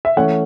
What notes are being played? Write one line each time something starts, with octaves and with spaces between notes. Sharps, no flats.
E5
E3 A3 C#4 F#5